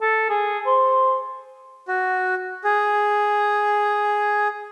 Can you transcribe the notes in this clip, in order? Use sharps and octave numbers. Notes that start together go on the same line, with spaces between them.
A4
G#4
C5
F#4
G#4